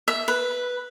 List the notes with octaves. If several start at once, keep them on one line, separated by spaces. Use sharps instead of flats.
E5
B4